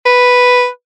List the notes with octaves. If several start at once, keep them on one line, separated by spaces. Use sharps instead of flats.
B4